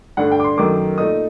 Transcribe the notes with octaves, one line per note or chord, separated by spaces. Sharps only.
G2 D3 A3 D4 F#5
G5
D6
C6
F#2 D#3 A3 D6
A#2 A3 D#4 D#6